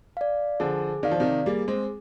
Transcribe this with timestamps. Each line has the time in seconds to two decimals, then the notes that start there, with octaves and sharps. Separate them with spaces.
0.17 D5 F5
0.60 D3 F3 G#4
1.03 D#3 D5 F5
1.11 F3
1.20 C3 D#3
1.46 G3 A#3 G#4
1.68 G#3 C4